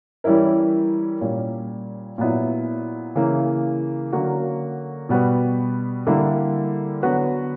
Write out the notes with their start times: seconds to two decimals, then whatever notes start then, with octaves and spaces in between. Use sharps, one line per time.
0.24 E3 G3 C#4 E4 A#4
1.21 A#2 G3 C#4
2.18 A#2 F#3 B3 E4
3.15 C#3 E3 A#3
4.12 D3 F#3 A#3 C#4 F#4
5.09 B2 G3 B3 F#4 B4
6.07 D3 G3 A#3 E4
7.03 D3 F#3 B3 F#4 B4